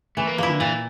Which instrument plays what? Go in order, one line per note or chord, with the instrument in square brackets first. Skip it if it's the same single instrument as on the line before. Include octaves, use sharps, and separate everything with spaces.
[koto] E3 [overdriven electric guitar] A3
[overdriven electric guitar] A#3
[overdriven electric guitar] F3 [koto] A#3 E4
[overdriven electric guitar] D3
[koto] A#2 [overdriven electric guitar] E3